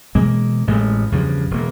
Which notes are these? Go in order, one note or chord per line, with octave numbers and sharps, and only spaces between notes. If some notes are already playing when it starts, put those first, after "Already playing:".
B2 E3 G#3 A#3
A1 A2 C3 G#3
E2 G2 C#3 F3
E1 A#3